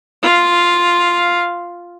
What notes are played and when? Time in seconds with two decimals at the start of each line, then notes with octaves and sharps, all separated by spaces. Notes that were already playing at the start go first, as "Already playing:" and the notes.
0.23 F4 F5